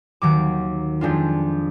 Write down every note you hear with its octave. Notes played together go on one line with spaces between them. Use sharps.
D#2 D#3 F#3 D6
F2 F3 G#3 D4 F4